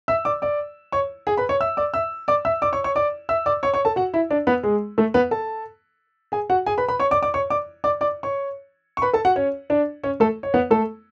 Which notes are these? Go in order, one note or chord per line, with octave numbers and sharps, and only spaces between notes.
E5 E6
D5 D6
D5 D6
C#5 C#6
G#4 G#5
B4 B5
C#5 C#6
E5 E6
D5 D6
E5 E6
D5 D6
E5 E6
D5 D6
C#5 C#6
C#5 C#6
D5 D6
E5 E6
D5 D6
C#5 C#6
C#5 C#6
A4 A5
F#4 F#5
E4 E5
D4 D5
B3 B4
G#3 G#4
A3 A4
B3 B4
A4 A5
G#4 G#5
F#4 F#5
G#4 G#5
B4 B5
B4 B5
C#5 C#6
D5 D6
D5 D6
C#5 C#6
D5 D6
D5 D6
D5 D6
C#5 C#6
C#6
B4 B5
A4 A5
F#4 F#5
C#4 C#5
D4 D5
C#4 C#5
A3 A4
C#5
B3 B4
A3 A4